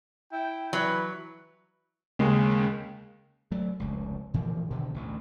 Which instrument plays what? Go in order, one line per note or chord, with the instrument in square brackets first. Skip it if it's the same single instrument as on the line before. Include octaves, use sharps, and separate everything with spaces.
[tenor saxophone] E4 [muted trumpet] G5
[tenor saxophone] E3 [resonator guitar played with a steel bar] F#3 [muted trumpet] B4
[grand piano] D#2 G#3 [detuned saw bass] C#3
[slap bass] F#3 A3
F1 C#2
A#2 E3 F3
B2 D3 D#3
A1 D2